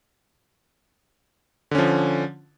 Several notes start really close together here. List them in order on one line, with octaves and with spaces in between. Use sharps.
D3 C#4 F3